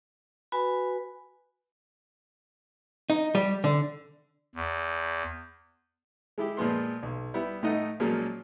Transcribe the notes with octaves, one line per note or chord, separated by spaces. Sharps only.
F#4 B4 G#5 B5
D#4
G3
D3
E2
G#3 E4 G4
A#2 F3 G#3 B3 C6
B1
G3 B3 E4
A2 A3 D#4 D#5 F#5
A#2 F3 F#3 G#3 A#3 C#4